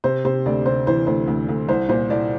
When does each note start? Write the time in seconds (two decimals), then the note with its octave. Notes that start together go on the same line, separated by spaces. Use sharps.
0.04 C3 C5
0.25 C3 C5
0.46 D2 D5
0.66 C3 C5
0.87 E3 C5
1.07 D2 C5
1.27 D2
1.48 D2
1.69 C2 C5
1.89 A#2 C5
2.10 C2 D5